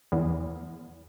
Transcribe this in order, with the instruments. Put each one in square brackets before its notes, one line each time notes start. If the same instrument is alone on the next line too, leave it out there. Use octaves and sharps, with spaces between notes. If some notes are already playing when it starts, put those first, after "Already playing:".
[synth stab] E2